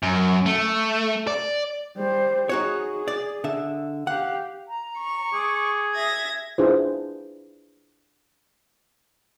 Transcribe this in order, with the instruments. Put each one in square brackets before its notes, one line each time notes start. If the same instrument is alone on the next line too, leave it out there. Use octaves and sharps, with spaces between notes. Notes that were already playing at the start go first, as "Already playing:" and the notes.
[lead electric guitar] F#2
A3
D5
[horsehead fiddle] G3 C5
[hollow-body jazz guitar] D#4 F#4 C#5 [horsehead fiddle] G#4
[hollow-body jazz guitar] D5
D3 E5
[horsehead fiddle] G4 F5 [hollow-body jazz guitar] F#5
[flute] A#5
[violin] C#6
[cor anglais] G#4 [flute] D6
[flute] E5 [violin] G#6 A#6
[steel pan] D4 E4 F4 G#4 B4 C5